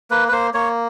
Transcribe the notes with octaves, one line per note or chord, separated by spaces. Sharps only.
A#3 B4
B4
A#3 C5
A#3 C#5